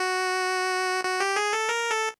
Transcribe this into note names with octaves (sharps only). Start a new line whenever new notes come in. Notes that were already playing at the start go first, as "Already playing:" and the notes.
Already playing: F#4
F#4
G4
G#4
A4
A#4
A4